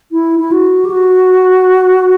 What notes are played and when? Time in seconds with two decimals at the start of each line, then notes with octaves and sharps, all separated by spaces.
0.12 E4
0.40 E4
0.52 F#4
0.85 G4
0.90 F#4